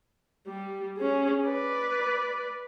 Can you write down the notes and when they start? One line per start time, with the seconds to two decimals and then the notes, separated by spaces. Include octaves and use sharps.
0.47 G3
0.98 C#4 G#4
1.47 B4 D5